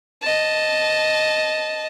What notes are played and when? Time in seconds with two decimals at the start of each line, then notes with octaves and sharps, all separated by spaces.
0.22 D#5 A5